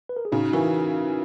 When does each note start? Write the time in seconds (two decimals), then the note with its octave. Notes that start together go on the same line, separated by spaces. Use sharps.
0.09 B4
0.17 A#4
0.25 G#4
0.32 C#3 D#4 F#4
0.53 E3 F#4 A#4